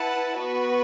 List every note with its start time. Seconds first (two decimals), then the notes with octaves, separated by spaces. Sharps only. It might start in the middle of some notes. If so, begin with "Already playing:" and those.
Already playing: E4 B4 F#5 A5
0.37 B3 F#4 B4